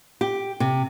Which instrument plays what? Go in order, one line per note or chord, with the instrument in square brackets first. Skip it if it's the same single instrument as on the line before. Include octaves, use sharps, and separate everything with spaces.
[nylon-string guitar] G4
C3